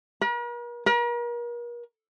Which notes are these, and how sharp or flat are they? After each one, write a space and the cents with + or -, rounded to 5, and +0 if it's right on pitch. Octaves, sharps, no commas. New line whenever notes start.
A#4 +45
A#4 +40